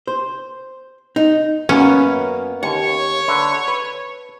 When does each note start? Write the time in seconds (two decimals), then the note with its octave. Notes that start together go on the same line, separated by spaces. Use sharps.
0.07 C5
1.16 D#4
1.69 F#2 A#3 B3 C#4
2.63 D#2 C#5 C#6
3.28 D3 B4 E5
3.68 B4